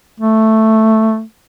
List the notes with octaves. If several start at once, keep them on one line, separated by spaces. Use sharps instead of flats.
A3